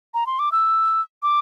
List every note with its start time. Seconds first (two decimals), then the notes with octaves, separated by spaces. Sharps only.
0.14 A#5
0.27 C6
0.39 D6
0.52 E6
1.23 D6